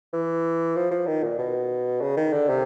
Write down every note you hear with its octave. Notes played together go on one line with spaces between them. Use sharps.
E3
F3
F3
D#3
A#2
B2
C#3
D#3
D3
C3